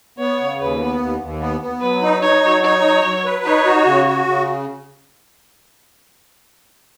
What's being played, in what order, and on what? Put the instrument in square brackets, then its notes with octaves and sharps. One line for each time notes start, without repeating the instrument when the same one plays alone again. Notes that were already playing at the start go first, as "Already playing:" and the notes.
[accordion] B3 [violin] C#5
[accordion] C#3
[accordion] D#2 [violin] B4
[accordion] B3
D#2
D#2
B3
B3
[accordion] F#3 [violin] B4
[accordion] D#4
[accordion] D#4 [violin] C#5
[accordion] F#3
[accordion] D#4 [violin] C#5
[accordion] F#3
F#3
B4
[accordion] D#4 [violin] C#5
[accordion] F#4
C#3
F#4
C#3